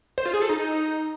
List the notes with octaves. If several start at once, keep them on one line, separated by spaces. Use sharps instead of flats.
C5
F4
G#4
A4
D#4